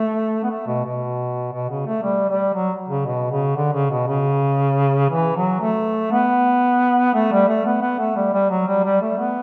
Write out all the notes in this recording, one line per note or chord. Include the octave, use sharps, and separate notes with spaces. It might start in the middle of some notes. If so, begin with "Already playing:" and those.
Already playing: A3
B3
A3
B2
B2
B2
C#3
A3
G3
G3
F#3
C#3
B2
C#3
D3
C#3
B2
C#3
E3
F#3
A3
B3
A3
G3
A3
B3
B3
A3
G3
G3
F#3
G3
G3
A3
B3